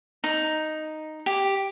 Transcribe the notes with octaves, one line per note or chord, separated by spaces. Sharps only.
D#4
G4